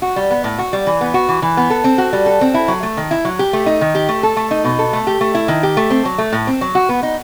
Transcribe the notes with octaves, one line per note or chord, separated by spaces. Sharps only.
F#4
G3
B3
A2
F#4
G3
E3
B3
F#4
E3
E3
B3
A4
C4
F#4
G3
A4
C4
E4
F#3
A3
D#3
E4
F#3
G4
A3
D#4
D#3
G4
A3
A4
A3
D#4
B2
A4
A3
G4
A3
E4
D#3
G4
A3
C4
F#3
A3
A2
C4
F#3
F#4
B3
D#4